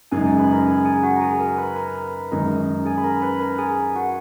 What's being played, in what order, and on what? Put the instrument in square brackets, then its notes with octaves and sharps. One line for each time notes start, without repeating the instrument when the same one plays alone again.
[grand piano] F#2 C#3 G#3 D#4 [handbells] G#4 G#5
[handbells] G#4 G#5
B4 B5
A#4 A#5
G#4 G#5
G#4 G#5
F#4 F#5
A#5
G#4 G#5
A#4 A#5
B4 B5
A#4 A#5
B4 B5
[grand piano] F#2 D#3 G#3 D#4 [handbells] A#4 A#5
[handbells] G#4 G#5
B5
A#4 A#5
B4 B5
A#4 A#5
G#4 G#5
F#4 F#5